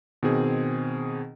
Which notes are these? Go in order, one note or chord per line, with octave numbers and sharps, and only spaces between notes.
B2 D#3 C4 G#4